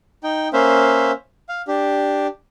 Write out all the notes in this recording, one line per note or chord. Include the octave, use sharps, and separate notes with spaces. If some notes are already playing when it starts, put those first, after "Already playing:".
D#4 G5
A#3 C#4 C5 E5 F5
F5
D4 G4